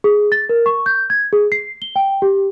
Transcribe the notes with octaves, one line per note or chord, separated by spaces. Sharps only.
G#4
A6
A#4
C#6
G6
G#6
G#4
C7
G7
G5
G4